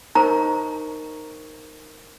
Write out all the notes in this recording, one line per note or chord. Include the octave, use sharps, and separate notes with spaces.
D#4 A#4 C5 A#5 C#6